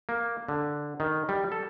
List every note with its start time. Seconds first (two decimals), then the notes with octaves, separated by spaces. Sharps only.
0.09 A#3
0.49 D3
1.00 D#3
1.29 G3
1.52 A4